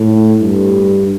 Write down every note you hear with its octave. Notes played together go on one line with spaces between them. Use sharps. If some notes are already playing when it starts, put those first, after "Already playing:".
Already playing: A2
G2